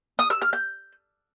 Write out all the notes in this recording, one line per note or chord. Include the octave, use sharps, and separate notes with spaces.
D#6
E6
F6
G6